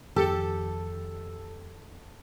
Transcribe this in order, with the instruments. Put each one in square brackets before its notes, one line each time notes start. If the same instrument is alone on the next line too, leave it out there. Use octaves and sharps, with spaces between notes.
[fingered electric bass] F2 D#3 [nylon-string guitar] G4 [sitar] A4